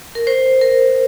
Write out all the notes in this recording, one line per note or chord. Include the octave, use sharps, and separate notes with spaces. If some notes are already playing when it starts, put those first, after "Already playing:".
A#4
C5
A#4